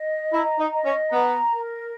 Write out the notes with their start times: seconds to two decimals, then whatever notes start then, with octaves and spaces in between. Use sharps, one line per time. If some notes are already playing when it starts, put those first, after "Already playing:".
Already playing: D#5
0.32 E4 A#5
0.58 D#4
0.72 D#5
0.85 C#4
1.11 B3 A#5
1.52 A#4